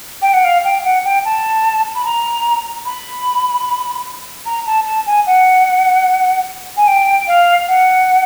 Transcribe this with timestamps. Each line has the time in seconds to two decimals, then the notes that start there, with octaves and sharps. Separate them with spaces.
0.22 G5
0.34 F#5
0.44 F5
0.64 G5
0.85 F#5
1.05 G5
1.25 A5
1.95 B5
2.05 A#5
2.85 B5
4.46 A#5
4.67 A5
4.87 A5
5.06 G#5
5.26 F#5
6.77 G#5
6.87 G5
7.28 F5
7.68 F#5